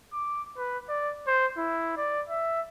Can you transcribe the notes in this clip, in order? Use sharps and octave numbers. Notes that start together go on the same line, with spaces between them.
D6
B4
D5
C5
E4
D5
E5